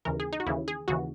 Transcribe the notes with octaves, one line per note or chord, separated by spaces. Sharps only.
D#2 C#3 E3 A#4
G#4
D#4
F#4
D#2 C#3 E3 E4
G#4
D#2 C#3 E3 F#4